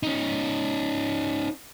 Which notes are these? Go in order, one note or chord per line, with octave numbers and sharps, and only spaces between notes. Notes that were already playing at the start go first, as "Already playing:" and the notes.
C#4 D#4